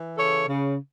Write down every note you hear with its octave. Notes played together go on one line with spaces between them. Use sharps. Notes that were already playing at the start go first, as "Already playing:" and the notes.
Already playing: E3
C#3 A4 C#5
C#3